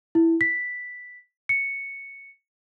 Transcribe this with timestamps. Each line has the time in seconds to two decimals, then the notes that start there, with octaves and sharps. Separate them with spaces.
0.15 E4
0.41 B6
1.49 C#7